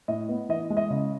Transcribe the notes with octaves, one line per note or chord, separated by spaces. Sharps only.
A2 D#5
B3
E3 D#5
G#3
D#5
C#3